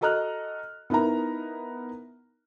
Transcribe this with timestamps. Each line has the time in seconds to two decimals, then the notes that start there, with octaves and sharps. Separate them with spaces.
0.01 F#4 A4 D#5 A#5 F6 F#6
0.90 B3 D#4 E4 A#4 A#5